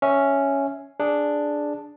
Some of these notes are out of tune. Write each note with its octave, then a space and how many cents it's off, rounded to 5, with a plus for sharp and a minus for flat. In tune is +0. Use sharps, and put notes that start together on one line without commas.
C#4 +0 E5 +0
D4 +0 G#4 +0